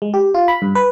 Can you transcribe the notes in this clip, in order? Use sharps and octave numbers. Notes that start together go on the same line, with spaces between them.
G#3
G4
F4
B5
G2
B4